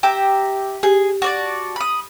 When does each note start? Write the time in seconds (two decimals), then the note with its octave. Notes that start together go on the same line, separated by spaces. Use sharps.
0.03 G4 E5 A#5
0.83 G4 G#4
1.22 F#4 D5 A5
1.76 B5 D#6